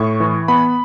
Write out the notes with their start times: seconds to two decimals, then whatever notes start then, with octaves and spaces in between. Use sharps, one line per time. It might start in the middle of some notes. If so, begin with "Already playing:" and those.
Already playing: A2 C#6
0.20 E3
0.48 B3 B5